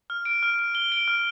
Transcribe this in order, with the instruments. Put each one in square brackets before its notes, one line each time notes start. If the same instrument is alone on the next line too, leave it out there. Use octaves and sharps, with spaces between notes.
[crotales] F6
D7
F6
F6
G7
D7
F6